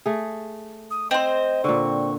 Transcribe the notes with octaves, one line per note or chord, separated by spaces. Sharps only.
A3 G#4
D#6
C4 C5 D#5
A#2 D3 C#6